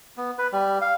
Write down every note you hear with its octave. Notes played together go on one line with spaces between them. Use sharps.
B3
B4
G3
F5